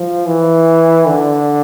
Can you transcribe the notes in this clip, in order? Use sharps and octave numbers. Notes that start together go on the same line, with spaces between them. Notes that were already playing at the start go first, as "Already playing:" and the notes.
Already playing: F3
E3
D3